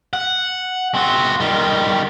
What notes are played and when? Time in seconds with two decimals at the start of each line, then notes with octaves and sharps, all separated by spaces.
0.13 F#5
0.95 C4 F#4
1.40 D#3 G3